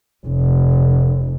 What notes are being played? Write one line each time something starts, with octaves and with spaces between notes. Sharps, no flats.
F1